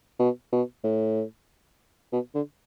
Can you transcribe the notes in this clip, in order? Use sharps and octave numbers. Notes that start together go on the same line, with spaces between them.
B2
B2
A2
B2
D3